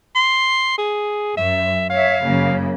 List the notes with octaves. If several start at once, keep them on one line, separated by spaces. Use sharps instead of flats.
C6
G#4
F#2 E5
C#5 E5 F5
F#2 C#3 A#3